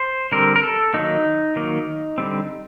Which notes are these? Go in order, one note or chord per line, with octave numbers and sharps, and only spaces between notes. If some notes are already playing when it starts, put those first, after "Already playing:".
Already playing: C5
D3 G3 C4 A#4
A#4
A4
D#3 F#3 A#3 D#4
D#3 F#3 A#3
D3 G3 C4